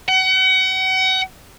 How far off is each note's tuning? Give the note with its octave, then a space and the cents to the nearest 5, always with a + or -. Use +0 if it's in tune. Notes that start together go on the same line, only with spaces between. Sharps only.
F#5 +35